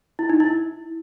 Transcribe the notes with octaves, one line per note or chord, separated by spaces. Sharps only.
E4
D#4
E4